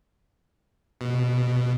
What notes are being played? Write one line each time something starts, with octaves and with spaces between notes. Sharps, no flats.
B2